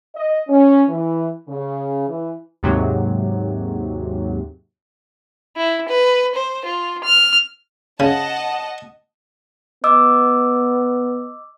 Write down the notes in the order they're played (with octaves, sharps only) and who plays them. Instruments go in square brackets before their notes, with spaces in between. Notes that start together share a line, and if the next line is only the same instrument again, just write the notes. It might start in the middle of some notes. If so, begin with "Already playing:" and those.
[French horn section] D#5
C#4
E3
C#3
E3
[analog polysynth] D#2 G#2 C3 F#3
[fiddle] E4
B4
C5
F4
F6
[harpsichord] C#3 [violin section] D#5 F#5 A5
[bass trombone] B3 [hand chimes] D#5 D6 E6